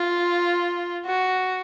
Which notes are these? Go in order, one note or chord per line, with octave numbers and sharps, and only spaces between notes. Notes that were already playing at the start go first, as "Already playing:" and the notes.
Already playing: F4
F#4